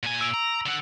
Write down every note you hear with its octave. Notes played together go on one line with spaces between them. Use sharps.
A#2 G#5
E6 D7 F7
A#5
D3 F#5